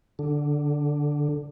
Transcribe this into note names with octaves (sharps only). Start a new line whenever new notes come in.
D3